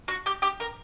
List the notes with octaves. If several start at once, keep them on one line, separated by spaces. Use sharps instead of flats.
F#4
G4
G4
A#4